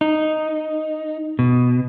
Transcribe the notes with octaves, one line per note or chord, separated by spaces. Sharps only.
D#4
B2